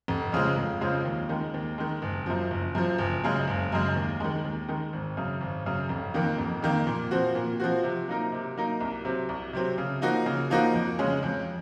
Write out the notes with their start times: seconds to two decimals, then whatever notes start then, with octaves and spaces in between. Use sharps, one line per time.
0.08 F1
0.32 F2 C#3 F3 G#3
0.56 F1
0.81 F2 C#3 F3 G#3
1.05 D#2
1.29 D#3 G#3
1.54 D#2
1.78 D#3 G#3
2.02 F#1
2.26 F#2 F3
2.51 F#1
2.75 F#2 F3
2.98 F#1
3.23 F#2 C#3 G#3
3.48 F#1
3.72 F#2 C#3 G#3
3.96 D#2
4.20 D#3 G#3
4.45 D#2
4.68 D#3 G#3
4.93 G#1
5.17 F#2 C#3
5.41 G#1
5.66 F#2 C#3
5.89 F1
6.14 F2 D#3 A#3
6.38 F1
6.62 F2 D#3 A#3
6.87 A#2
7.11 F3 C4 F#4
7.35 A#2
7.60 F3 C4 F#4
7.83 C3
8.08 F#3 A#3 D#4 A#4
8.32 C3
8.56 F#3 A#3 D#4 A#4
8.80 C2
9.04 C3 F#3 C4
9.29 C2
9.53 C3 F#3 C4
9.78 C#3
10.02 F3 A#3 D#4 F#4
10.26 C#3
10.50 F3 A#3 D#4 F#4
10.74 F2
10.99 C#3 G#3 C#4
11.23 F2